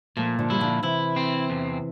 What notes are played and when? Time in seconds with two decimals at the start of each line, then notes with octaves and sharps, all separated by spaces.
0.17 A#2 F3 A3
0.39 D3 F3
0.50 G3 E4
0.61 D3 F3
0.83 C3 E3 E4
1.16 C4
1.50 E2